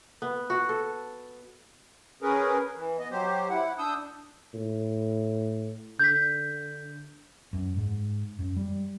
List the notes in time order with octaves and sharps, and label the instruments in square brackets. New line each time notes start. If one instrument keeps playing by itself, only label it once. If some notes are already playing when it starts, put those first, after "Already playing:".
[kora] B3
F#4
A4
[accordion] C#4 G#4 A#4 B4
E3
B3 D#5
F#3 G4 C5
E4 F#5
D4 D#6 E6 G6
[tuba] A2
[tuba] D3 [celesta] G6 B6
[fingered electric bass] F#2
G#2
F#2
G3